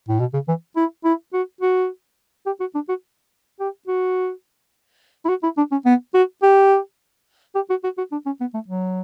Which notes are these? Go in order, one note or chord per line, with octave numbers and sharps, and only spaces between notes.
A2
B2
C#3
E3
E4
E4
F#4
F#4
G4
F#4
D4
F#4
G4
F#4
E4
F#4
E4
D4
C#4
B3
F#4
G4
G4
F#4
F#4
F#4
D4
C#4
B3
A3
F#3